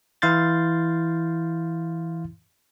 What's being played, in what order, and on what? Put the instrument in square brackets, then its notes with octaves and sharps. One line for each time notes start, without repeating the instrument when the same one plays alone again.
[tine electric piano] E3 E4 F5 C6 G6 A6